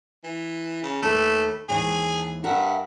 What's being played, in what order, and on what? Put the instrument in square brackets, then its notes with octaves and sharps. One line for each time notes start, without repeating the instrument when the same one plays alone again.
[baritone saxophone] E3
C#3
[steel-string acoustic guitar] D#2 A4 B4 [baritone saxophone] A3
[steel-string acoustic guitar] D#2 G#2 E3 [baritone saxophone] G#4
[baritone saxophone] G2 [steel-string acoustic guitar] A#4 E5 F#5